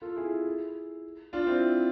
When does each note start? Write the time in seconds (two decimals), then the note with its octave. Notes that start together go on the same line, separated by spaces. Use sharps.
0.02 F4 A4
0.17 E4 G#4
1.33 D4 F4
1.47 C4 E4